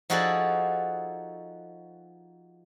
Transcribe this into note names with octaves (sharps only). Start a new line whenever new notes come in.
F3 D#4 F#4 G#4 A4 D5